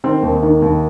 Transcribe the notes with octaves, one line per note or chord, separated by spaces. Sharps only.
D#3 C4
D#2
D#3
D#2